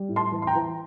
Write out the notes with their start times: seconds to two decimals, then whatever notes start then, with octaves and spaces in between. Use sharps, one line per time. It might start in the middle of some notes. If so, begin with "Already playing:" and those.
Already playing: G3
0.09 A2
0.16 A5 C6
0.32 E3
0.42 C6
0.47 G5 A#5
0.55 E3